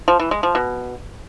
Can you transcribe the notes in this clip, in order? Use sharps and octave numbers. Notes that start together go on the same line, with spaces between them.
F3
E3
G#3
F3
B2